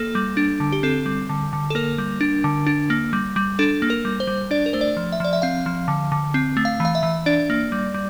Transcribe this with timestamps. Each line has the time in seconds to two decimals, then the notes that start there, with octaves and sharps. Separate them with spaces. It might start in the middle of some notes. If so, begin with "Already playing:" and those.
Already playing: A#3 A4
0.15 G3
0.37 D4
0.60 D3
0.72 G4
0.83 C4 A4
1.06 G3
1.29 D3
1.53 D3
1.70 A4
1.75 A#3 A#4
1.98 G3
2.21 D4
2.44 D3
2.66 D4
2.90 A#3
3.13 G3
3.36 G3
3.59 D4 A4
3.82 A#3
3.90 A#4
4.05 G3
4.20 C5
4.27 G3
4.51 D4 D5
4.66 A#4
4.73 A3 C5
4.81 D5
4.97 F3
5.12 E5
5.20 F3 D5
5.33 E5
5.42 C4 F5
5.66 F3
5.88 D3
6.12 D3
6.34 C4
6.57 A3
6.65 F5
6.80 E3 F5
6.95 E5
7.03 E3
7.26 D4 D5
7.50 A#3
7.72 G3
7.94 G3